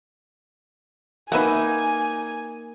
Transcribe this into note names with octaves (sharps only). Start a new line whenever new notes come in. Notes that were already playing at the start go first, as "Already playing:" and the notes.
A#3 D#4 B4 E5 F#5 G#5